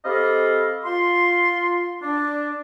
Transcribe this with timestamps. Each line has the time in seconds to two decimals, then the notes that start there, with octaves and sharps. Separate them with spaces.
0.05 C4 G4 A4 D#5 F5 B5
0.84 F4 C6
2.02 D4